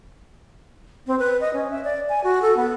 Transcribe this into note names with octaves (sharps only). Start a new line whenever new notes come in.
C4
B4
D#5
C#4
E5
D5
G#5
F#4
A4
B3